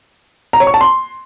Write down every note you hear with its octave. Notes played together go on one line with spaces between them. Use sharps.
A#5
C#5
C#6
A5
C6